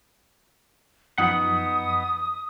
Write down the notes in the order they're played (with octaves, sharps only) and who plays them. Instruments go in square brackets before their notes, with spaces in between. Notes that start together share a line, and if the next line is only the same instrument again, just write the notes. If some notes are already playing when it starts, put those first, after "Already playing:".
[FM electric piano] F#2 F3 [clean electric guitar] B3 D#4 F#5 [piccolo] D#6